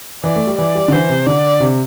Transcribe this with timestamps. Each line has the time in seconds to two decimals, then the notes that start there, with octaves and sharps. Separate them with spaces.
0.24 E3 D5
0.36 A3
0.47 G3
0.58 E3 D5
0.75 G3
0.88 D3
0.92 E3 C5
1.10 C3
1.26 D3 D5
1.60 C3